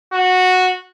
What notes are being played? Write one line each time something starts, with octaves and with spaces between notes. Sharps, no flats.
F#4